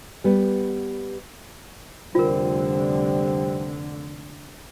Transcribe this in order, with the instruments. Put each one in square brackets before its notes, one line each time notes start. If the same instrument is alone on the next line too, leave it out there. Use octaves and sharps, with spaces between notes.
[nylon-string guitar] G3 B3
[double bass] F1 D3 [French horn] G3 [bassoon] C4 [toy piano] F4 A#4